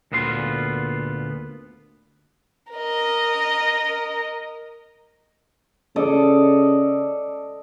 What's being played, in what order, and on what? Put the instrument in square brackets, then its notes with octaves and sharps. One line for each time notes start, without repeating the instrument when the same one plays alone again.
[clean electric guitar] D2 A#2 B3 F4 C6
[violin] A#4 D#5
[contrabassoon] C#3 [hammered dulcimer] A4 D5 D#5